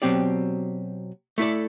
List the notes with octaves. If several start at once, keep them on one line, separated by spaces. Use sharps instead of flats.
B2 F#3 C4 G4 D5
A3 E4 A4 D5